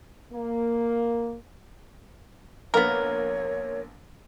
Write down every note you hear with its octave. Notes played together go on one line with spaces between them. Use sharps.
A#3
A#1 A#3 B3 A#4 C#5